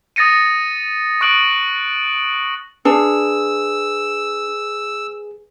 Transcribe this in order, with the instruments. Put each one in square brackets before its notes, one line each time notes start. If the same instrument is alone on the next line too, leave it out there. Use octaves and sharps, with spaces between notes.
[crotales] D#6 A6 A#6 C#7 D#7
C#6 D#6 F#6 D7 F#7
[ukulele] D4 [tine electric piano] G#4 [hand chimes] B4 [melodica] E6